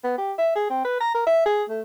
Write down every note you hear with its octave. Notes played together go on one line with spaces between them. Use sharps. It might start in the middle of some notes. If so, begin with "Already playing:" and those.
B3
G4
E5
G#4
C4
B4
A#5
A#4
E5
G#4
A3